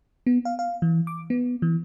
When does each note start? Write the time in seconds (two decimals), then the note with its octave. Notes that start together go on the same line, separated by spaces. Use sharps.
0.27 B3
0.45 F5
0.59 F5
0.82 E3
1.07 D6
1.30 B3
1.62 E3